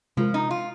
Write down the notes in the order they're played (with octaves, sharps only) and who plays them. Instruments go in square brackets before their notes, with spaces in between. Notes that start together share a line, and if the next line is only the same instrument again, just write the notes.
[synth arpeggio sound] C3 G#3 F4 A#4 [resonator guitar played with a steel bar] F3
[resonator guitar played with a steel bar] D#4
F4